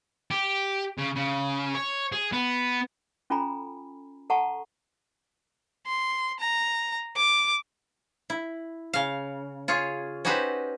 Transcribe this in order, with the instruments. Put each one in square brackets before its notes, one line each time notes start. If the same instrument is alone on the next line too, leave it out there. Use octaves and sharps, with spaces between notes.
[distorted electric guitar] G4
C#3
C#3
C#5
G#4
B3
[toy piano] C#4 F4 A4 G#5 A#5 B5
A4 F#5 A5 A#5 C#6
[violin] C6
A#5
D6
[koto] E4
C#3 F5
F4 G#4 C#5
C#4 D#4 F#4 G4 B4 C5